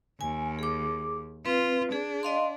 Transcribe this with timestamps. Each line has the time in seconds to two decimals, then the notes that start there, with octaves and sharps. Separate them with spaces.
0.21 D#2 G#5
0.59 G#4 D6
1.46 C4 F4 B4
1.92 D4 G#4
2.23 D#5 F5 C6